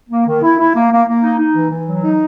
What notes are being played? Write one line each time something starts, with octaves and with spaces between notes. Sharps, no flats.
A#3
D#3
E4
E4
A#3
A#3
A#3
D#4
D#4
E3
E3
F#3
D#4